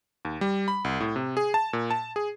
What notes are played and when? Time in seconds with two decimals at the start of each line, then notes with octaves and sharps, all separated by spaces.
0.25 D#2
0.41 G3
0.68 B5
0.84 C2
1.00 A2
1.16 C3
1.37 G#4
1.54 A5
1.73 A#2
1.90 A5
2.16 G#4